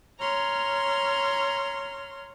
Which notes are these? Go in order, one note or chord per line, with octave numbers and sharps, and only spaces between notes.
C#5 A#5 C6 F6